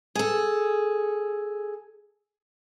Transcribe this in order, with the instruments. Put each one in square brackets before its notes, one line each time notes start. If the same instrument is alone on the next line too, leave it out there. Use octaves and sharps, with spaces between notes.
[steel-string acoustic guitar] G#4 A4